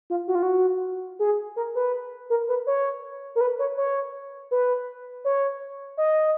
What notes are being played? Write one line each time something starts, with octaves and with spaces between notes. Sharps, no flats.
F4
F#4
F4
F#4
G#4
A#4
B4
A#4
B4
C#5
A#4
B4
C#5
C#5
B4
C#5
D#5